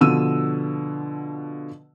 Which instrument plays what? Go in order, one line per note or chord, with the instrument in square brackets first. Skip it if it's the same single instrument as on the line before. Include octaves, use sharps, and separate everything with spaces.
[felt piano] B2 D3 F3 E6 D#7